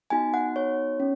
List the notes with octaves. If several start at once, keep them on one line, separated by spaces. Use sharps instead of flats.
B3 D#4 F#4 G#5
F#5
C#5
C#4